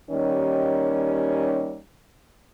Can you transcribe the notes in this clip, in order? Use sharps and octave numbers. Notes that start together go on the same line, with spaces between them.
D#2 D#3 G3 C#4